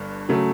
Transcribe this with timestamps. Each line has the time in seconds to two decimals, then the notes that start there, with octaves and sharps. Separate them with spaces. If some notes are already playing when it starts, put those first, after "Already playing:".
Already playing: G1 G2
0.29 C#3 F#3 A3